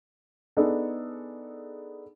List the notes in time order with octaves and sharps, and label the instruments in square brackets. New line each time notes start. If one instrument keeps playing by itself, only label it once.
[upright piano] B3 D4 D#4 G#4 A4